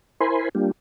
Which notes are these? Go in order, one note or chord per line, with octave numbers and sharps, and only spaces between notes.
E4 A#4 C5 G#5 B5 C6
G3 A#3 D4 F4 G4